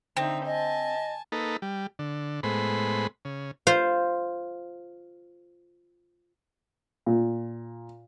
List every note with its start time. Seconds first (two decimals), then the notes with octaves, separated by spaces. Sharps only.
0.17 D3 C4 D#4 E5
0.46 D#5 G#5 A5
1.32 A#3 D#4 A4 B4
1.62 G3
1.99 D3
2.43 A2 G#3 B3 C5 B5
3.25 C#3
3.67 F4 C5
7.06 A#2